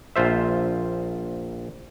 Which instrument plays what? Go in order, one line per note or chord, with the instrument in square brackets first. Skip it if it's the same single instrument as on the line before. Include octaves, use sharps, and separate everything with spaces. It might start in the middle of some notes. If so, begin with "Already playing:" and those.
[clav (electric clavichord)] A#1 F4 C5 E5